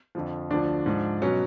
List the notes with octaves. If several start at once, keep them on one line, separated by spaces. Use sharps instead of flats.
F2 D3 F3
D2 D3 F3 D4
G#2 F3
B2 F#3 C#4